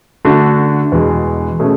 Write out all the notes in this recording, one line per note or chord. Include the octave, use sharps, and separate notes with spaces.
D3 A3 D4 F#4
E2 B2 G#3
B2 A3 C#4 G#4